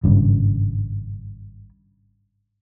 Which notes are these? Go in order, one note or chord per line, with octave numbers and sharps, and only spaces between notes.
G#1 G2 C#3